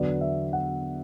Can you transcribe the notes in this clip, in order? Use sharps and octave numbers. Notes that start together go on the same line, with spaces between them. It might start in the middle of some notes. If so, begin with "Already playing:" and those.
Already playing: E2 D3 F#3 B3 D5
E5
F#5